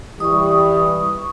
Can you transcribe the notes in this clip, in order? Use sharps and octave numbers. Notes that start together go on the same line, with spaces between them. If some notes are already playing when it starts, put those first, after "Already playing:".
E3 G3 C#6 D#6